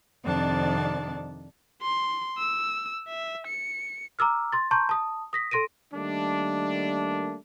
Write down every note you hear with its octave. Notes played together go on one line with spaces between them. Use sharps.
F2 C3 D#3 D4 D5 A5
C6
E6
E5
C#7
A#5 D6 E6 F6
C6 A6
A5 A#5 C6 C#6 G6
A5 D#6
D#6 A#6 B6
A4 C6 A#6 D7 D#7
D#3 G3 A3 A#3 D4